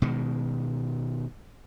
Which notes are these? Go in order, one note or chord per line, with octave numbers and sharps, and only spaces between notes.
B2 D#3 G#3